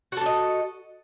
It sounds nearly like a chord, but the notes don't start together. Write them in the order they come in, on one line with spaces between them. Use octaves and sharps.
F#4 A4 D4 D#5